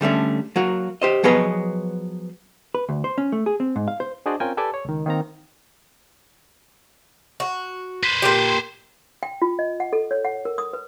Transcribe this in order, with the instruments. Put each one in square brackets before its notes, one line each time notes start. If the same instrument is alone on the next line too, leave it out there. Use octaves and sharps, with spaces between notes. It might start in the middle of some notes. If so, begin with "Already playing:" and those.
[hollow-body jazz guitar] D3 G3 A3 C#4
F#3 A#3 F#4
G4 C5 D#5
F3 F#3 B3 G#4 B4 D#5
B4
D2
C5
C#4
A3
G#4
C4
G#2
F5
C5
[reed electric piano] D4 F#4 G#4 C5 D5 D#5
C4 C#4 F4 A#4 G5 G#5
G4 A4 B4 D5 G#5 D6
C#5
C#2 D#3
D#3 A#3 C4 A#5
[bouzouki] F#4
[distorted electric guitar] B4 C5
[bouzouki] A#2 G4
[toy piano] G5
F4
D#5
F#5
A4
C#5
F#5
A#4
D#6
B4